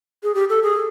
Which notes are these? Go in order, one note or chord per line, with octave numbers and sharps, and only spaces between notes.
G#4
G4
A4
G#4